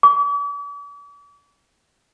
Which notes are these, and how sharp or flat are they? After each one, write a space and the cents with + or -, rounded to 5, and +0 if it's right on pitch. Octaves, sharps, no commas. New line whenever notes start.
D6 -45